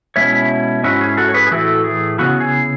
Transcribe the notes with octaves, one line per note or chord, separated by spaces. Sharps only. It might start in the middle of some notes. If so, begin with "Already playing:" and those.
B2 G#3 C#4 E4 C#5 E5
G#2 G#3 C#4 E4 F#4
G#4
F#4 A4
C#5
G#4 B4
G#4
A2 E3 A3 E4 F#4 A4
G#4
C#3 E3 B3 E4 F#4
G#4